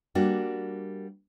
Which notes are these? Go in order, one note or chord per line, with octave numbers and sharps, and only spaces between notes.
G3 A#3 D4 F#4